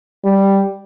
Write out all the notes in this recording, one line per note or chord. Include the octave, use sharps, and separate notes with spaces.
G3